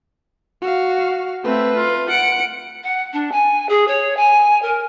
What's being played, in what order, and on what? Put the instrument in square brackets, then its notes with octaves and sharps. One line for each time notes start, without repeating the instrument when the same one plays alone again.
[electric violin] F#4 F5
[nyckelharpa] A3 C4 [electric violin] B4
[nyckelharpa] F4
[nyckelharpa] F#5 [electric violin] C#7 D7
[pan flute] F#5
D4
G#5
G#4
C#5
G#5
A#4